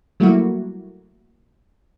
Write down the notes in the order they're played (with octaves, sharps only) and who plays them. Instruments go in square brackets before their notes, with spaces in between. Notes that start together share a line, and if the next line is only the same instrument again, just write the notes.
[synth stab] F#3 G3 A3 A#3 E4 F#4